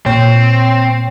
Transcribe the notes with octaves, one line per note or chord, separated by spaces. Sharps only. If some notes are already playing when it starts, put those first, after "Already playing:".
A#2 C4 C#5 G5